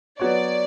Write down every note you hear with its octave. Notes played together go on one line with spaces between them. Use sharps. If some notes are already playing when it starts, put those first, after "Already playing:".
F#3 B3 F#4 C#5 D5